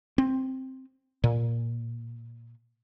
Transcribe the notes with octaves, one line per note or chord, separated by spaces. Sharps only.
C4
A#2